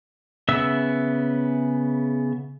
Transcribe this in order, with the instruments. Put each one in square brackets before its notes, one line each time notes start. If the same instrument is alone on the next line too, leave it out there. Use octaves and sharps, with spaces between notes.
[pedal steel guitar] C#3 B3 E5 E6